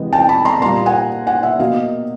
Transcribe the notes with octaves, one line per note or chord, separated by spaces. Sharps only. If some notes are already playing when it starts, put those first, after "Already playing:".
Already playing: C3 E3 G#3 B3 D#5
G5 A5
A5 B5
A#5 C6
A#2 G3 A#3 A#5 C6
F#5 G#5
F#5 G#5
E5 F#5
B2 F#3 A#3 D#5 F5